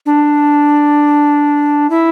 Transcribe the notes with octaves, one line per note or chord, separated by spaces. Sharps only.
D4
E4